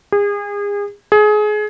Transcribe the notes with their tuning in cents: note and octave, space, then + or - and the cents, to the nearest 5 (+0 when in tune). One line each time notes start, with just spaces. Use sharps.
G#4 -35
G#4 +25